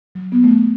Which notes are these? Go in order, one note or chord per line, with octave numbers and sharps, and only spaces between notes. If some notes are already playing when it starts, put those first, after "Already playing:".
F#3
B3
A3